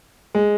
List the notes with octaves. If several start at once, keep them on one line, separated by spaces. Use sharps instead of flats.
G#3